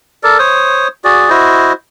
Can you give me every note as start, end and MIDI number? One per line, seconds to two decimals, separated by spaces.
0.23 0.37 69
0.23 0.37 70
0.23 0.37 74
0.39 0.88 72
0.39 0.88 73
0.39 0.88 87
1.04 1.30 66
1.04 1.30 68
1.04 1.30 74
1.30 1.73 64
1.30 1.73 66
1.30 1.73 72
1.30 1.73 75